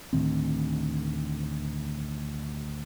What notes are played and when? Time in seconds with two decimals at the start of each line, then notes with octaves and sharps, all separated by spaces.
0.13 D2 A2 D#3 C4